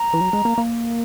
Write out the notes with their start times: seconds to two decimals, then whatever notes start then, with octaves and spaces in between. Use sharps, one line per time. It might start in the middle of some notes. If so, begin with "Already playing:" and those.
Already playing: A#5
0.13 E3
0.21 F#3
0.33 G#3
0.45 A#3
0.58 A#3